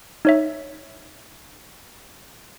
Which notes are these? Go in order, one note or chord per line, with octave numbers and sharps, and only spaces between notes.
D#4 C#5 E5